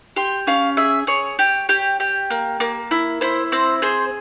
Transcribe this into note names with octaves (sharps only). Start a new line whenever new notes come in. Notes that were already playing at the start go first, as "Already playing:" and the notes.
G4 C6
C#4 F5
G#4 E5
G#4 C#5
G4
G4
G4
A#3
A#3
E4
E4 C5
C4 C5
G#4 C5